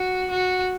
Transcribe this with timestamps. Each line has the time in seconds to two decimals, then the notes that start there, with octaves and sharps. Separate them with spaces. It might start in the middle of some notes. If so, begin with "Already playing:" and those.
Already playing: F#4
0.30 F#4